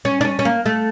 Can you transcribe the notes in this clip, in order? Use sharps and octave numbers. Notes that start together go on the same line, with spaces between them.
C#4
D4
C#4
C#4
A#3
A3